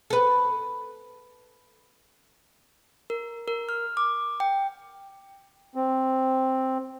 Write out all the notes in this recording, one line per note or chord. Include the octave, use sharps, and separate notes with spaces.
A4 B4
A#4
A#4
F6
D6
G5
C4